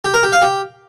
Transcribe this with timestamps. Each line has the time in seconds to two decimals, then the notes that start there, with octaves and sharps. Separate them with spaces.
0.05 G4
0.14 A#4
0.23 G4
0.32 F5
0.42 G4